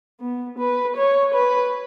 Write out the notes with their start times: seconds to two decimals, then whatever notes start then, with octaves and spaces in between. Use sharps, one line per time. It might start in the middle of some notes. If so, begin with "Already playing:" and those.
0.21 B3
0.59 B4
0.97 C#5
1.34 B4